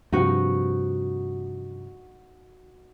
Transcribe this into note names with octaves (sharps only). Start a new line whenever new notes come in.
G2 C3 F3 D#4 F#4